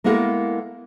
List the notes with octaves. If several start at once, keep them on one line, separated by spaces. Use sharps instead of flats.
G#3 A#3 B3 E4 A4 A#4